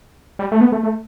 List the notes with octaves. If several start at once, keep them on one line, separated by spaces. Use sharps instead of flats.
G3
A3
B3
A3
A3